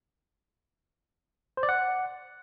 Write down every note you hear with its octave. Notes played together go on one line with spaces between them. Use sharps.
C5
D5
F#5